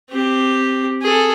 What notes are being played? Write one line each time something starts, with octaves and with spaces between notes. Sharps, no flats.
C4 G4
G#4 A4